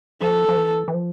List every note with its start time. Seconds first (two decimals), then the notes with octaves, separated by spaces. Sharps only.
0.21 F3 A4
0.49 F3
0.57 E3
0.88 E3
0.94 F3